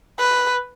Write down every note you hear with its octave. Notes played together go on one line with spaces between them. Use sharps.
B4